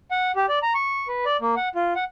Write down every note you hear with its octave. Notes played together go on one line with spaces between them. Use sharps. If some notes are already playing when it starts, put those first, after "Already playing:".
F#5
G4
D5
A#5
C#6
B4
D5
A#3
F#5
F4
F#5